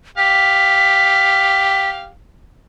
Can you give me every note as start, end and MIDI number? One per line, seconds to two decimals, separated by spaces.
0.17 2.09 67
0.17 2.09 77
0.17 1.90 95